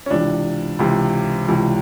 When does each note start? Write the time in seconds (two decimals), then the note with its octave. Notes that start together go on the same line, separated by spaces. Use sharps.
0.06 C#4
0.10 C#2 C3 E3 D4
0.79 C#2 C3 E3
1.48 C#2 C3 E3